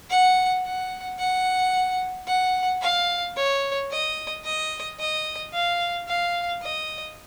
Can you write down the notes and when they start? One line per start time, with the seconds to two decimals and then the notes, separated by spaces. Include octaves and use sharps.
0.10 F#5
0.65 F#5
1.19 F#5
2.27 F#5
2.82 F5
3.36 C#5
3.91 D#5
4.45 D#5
4.99 D#5
5.53 F5
6.08 F5
6.62 D#5